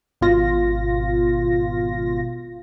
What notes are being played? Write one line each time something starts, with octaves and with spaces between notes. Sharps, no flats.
G#1 B2 F4 A#6